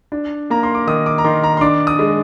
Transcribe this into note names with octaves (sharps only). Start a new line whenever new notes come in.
D4
A#3 A#5
C6
D6
D#3 D#6
D6
A#5
D#3 C6
A#5
C6
D4 D6
D#6
G#3